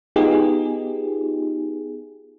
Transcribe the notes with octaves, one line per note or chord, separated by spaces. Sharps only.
B3 D#4 F4 G4 G#4